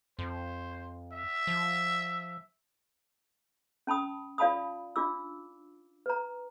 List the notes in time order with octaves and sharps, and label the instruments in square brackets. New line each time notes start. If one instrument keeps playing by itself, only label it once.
[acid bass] F2 [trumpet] C5
[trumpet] E5
[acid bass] F3
[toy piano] C#4 A5 B5 D#6
F4 D5 F5 A5 B5 D#6
D4 D#4 F4 D6 E6
B4 A#5